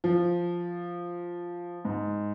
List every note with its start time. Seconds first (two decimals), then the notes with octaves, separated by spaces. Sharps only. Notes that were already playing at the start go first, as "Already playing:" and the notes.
0.04 F3
1.85 G#2